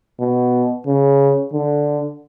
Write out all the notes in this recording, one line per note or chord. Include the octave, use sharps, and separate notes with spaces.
B2
C#3
D3